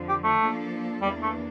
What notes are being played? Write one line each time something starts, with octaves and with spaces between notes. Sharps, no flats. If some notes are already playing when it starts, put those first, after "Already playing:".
Already playing: F2 D3 F3
G4
A3
F3 A#3 D4 A4
E2 E3 G3 A#3 D4
A3